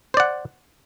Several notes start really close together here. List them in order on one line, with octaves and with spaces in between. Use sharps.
C5 D5 F#5